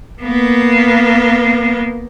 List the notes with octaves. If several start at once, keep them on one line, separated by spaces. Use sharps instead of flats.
A#3 B3